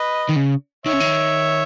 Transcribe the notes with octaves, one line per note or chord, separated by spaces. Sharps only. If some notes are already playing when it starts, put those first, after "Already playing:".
Already playing: B4 D#5
D#3
C#3
D#3 C#5 E5
C#3
D#3